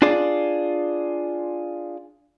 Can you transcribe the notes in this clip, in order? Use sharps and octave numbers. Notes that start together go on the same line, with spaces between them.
D4 F4 G#4 D5